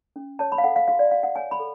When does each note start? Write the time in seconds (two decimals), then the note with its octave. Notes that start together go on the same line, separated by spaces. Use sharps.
0.16 C#4
0.39 C#5 A5
0.52 B5
0.58 F5
0.64 A4 F#5
0.76 F5
0.88 F#4 F5
0.99 D5
1.11 F#4 F5
1.23 F#5
1.36 C#5 G#5
1.51 B5
1.59 A4